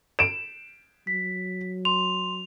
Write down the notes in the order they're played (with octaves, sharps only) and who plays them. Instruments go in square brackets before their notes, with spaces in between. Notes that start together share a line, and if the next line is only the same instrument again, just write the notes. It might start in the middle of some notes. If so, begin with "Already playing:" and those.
[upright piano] D7 E7
[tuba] F#3 [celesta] B6
[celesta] C6 [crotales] F7